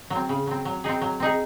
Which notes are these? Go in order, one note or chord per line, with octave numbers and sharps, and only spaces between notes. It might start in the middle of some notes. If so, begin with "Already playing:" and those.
F#3
C4
C#3
F#3 C4
F#3
C4 D#4 G#4
F#3
C4 D#4 G#4